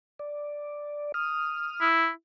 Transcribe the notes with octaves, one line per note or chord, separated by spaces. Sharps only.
D5
D#6 F6
E4